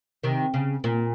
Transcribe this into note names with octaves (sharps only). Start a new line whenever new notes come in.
C3 D#3
C#3
A#2